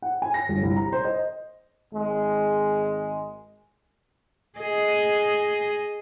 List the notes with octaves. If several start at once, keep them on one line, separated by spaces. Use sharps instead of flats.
F#5
G#5
A#6
G1
C2
A#5
C5
D#5
G#1 G#3
G#4 D#5